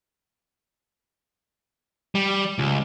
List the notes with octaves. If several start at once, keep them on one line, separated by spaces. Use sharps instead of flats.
G3
C#2